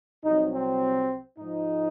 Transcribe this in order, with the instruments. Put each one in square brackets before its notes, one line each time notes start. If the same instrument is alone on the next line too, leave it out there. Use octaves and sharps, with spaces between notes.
[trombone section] C2 C3 F#3 D#4
C4
G#2 F3 G#3 D#4